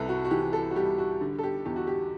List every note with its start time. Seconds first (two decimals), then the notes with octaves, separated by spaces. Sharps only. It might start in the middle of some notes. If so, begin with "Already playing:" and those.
Already playing: C2 C3 A4 B4
0.09 F#4
0.25 F#4
0.31 E3 G4
0.53 A4
0.71 F#4
0.75 G3 G4
0.98 F#4
1.21 D3
1.39 A4
1.43 G4
1.65 E2 G4
1.76 F#4
1.87 G4